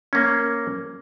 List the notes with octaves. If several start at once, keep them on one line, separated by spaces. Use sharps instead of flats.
A#3 C#4